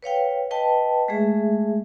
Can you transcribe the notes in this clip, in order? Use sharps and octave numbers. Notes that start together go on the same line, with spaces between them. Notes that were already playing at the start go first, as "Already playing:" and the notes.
B4 C#5 F5 G5
B4 D#5 G5 A5
G#3 A3 G#4 E5